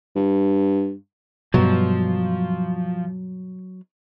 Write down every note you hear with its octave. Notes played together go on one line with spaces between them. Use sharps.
G2
G2 B2 F3 F#3